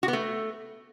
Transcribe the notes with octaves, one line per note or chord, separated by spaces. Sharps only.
F#4
B3
A3